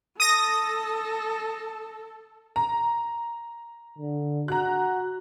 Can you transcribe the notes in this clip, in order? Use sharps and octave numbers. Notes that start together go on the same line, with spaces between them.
A4 D#6 A#6
A#5
D3
F#4 A#5 F#6